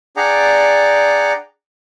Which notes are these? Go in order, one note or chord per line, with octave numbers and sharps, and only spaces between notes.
D4 G#4 D5 F#5 G5 A#5